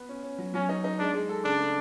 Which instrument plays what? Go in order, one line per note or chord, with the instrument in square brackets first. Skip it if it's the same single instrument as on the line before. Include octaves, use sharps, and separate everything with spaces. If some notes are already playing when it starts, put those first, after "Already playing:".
Already playing: [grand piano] B3
C#4
C#4
F#3
[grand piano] F#3 [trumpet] C#4
[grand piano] D#4
D#4
[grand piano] G#3 [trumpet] D4
[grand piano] G#3
A4
[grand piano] C#3 [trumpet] D4
[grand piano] A3